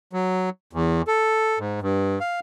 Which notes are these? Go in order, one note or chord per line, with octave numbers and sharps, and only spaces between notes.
F#3
E2
A4
G#2
G2
F5